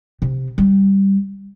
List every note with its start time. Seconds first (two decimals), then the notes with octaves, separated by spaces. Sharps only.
0.22 C3
0.58 G3